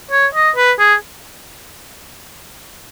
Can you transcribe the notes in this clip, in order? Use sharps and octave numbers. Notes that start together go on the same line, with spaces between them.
C#5
D#5
B4
G#4